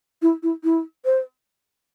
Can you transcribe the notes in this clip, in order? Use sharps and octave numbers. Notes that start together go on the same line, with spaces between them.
E4
E4
E4
C5